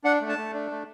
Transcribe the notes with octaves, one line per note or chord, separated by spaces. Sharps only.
D4 F#5
A3
A5
A3
D4
A3